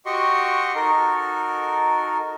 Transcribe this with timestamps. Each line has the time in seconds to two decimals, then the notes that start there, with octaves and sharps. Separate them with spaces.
0.06 F#4 G4 D#5 C6 C#6
0.75 D#4 F#4 A4 A#4